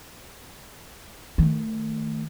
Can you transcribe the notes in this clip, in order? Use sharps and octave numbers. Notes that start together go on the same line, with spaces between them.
D#3 A3